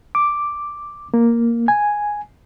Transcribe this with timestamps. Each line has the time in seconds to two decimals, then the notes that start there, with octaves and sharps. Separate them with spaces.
0.15 D6
1.14 A#3
1.68 G#5